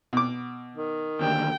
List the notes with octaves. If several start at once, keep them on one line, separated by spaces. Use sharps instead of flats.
B2 D6
D#3
D#2 D3 G5